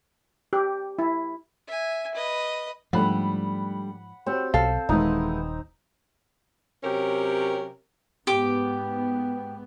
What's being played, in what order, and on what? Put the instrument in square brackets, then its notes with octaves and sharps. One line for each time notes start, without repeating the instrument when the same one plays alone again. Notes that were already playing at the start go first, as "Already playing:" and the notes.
[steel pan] G4
E4
[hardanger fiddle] E5 G#5
B4 D#5
[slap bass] G#2 F3 [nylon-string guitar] G3 A3 D4 [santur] F#5 B5
[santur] C4 [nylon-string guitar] F#4 G4 C#5
[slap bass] B1 [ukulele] A4 F5
[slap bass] D#1 [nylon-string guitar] E3 G#3 B3 [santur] D#4
[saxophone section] C3 F#3 C#4 G4 A#4
[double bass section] G#2 B3 [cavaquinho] G4 D6